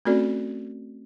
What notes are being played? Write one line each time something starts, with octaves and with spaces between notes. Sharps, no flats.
A3 C4 C#4 F#4 A4 D5